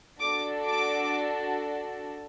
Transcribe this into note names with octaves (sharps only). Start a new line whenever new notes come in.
D4 F#4 A4 D6
D6